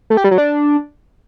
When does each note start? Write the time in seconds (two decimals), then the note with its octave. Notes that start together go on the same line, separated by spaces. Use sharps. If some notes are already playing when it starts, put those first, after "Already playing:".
0.10 A3
0.17 G4
0.24 G3
0.31 F#3
0.38 D4